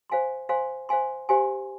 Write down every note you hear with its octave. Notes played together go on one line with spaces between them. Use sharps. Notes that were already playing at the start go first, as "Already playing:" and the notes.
C5 F5 G#5 C6
C5 F5 G#5 C6
C5 F5 G#5 C6
G4 C5 F5 G#5 C6